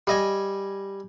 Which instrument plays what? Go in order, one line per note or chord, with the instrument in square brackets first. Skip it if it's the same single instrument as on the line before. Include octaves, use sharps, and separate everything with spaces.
[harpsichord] G3 D#5 G#5